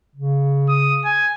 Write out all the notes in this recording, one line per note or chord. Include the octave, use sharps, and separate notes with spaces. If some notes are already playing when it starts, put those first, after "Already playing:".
C#3
D#6
G#5